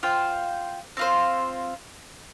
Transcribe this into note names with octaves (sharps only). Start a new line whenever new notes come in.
F4 C5 G5
C4 F4 C5